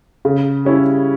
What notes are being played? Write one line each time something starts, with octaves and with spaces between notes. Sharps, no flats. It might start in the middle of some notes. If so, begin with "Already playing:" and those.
C#3
G3 C#4 E4